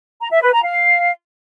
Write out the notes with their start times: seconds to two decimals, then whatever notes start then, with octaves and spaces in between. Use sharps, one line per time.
0.20 A#5
0.31 E5
0.42 B4
0.53 A#5
0.64 F5